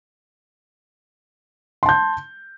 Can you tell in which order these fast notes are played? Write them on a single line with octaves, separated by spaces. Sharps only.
C6 A5 G6